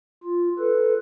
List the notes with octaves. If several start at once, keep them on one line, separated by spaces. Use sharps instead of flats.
F4
A4 B4